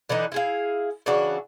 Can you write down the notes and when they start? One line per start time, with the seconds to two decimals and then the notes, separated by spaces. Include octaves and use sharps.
0.09 D3 E3 D4 D#4
0.32 E4 G#4 F5
1.06 C#3 E3 D4 F#4